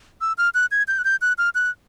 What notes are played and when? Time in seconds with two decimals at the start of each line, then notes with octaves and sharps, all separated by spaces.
0.21 E6
0.38 F6
0.54 F#6
0.71 G#6
0.88 G6
0.99 F#6
1.05 G6
1.21 F#6
1.38 F6
1.55 F#6